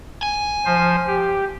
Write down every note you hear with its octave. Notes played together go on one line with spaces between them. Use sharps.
G#5
F3 C5
G4